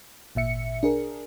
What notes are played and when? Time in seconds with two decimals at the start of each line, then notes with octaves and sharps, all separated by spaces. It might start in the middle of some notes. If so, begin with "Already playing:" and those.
0.35 G#1 A#2 E5 C#7
0.83 D4 G#4 A#4